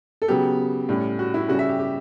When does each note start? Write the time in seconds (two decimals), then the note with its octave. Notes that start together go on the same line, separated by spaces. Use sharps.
0.22 A4
0.28 C#3 F#3 B3 G4
0.89 A2 G3 C#4
1.19 F#4
1.34 E4
1.49 C#3 G3 C#4 F#4
1.59 E5
1.69 G4
1.79 G4